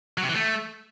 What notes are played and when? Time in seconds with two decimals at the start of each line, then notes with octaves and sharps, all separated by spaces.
0.18 F#3
0.23 C3
0.29 E3
0.35 A3